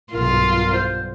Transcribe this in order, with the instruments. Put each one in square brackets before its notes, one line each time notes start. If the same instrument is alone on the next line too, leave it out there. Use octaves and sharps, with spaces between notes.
[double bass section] B1 G2 [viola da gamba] F4 [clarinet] A#4
[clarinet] C5